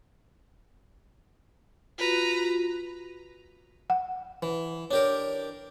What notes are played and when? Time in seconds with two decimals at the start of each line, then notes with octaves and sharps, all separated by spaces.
1.98 F4 F#4 B4 A#5
3.90 F#5
4.43 E3
4.91 D4 G4 A#4 C#5